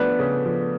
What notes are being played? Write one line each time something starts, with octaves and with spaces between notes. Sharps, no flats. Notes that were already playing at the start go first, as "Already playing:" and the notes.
Already playing: F3 A3 B3 D4
C#3
F3